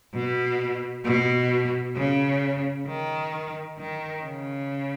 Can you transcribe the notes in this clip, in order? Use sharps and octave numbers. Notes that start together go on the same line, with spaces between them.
B2
B2
C#3
D#3
D#3
C#3